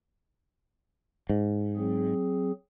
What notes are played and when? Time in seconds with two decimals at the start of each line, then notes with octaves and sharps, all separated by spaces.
1.29 G#2
1.77 F#3 C4 G#4